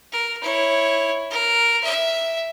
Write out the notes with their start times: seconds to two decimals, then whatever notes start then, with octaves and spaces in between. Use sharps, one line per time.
0.12 A#4
0.41 E4 C#5
1.30 A#4
1.83 E5